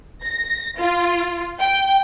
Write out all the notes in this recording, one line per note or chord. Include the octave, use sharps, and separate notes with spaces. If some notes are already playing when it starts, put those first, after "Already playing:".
A#6
F4
G5